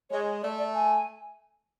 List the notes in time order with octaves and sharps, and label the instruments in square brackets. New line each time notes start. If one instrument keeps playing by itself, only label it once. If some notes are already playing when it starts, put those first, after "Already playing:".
[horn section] G#3 [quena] C#5
[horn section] A3 [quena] D5
[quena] D5
G#5